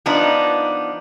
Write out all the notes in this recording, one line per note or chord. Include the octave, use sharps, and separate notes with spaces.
F3 B3 D4 D#4